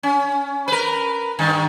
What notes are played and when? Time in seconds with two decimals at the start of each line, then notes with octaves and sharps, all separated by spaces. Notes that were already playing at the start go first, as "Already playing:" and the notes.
0.03 C#4
0.68 A#4 B4
1.39 G2 D#3